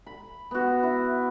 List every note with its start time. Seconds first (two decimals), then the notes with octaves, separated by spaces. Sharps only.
0.06 B5
0.51 B3 F#4
0.83 E4